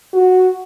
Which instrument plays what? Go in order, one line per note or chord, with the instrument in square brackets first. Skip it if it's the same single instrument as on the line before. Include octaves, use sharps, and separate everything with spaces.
[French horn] F#4